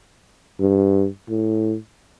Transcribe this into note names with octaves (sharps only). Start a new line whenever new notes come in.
G2
A2